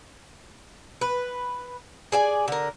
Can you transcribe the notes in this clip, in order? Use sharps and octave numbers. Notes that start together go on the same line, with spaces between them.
B4
G#4 D5 G#5
D3 A#4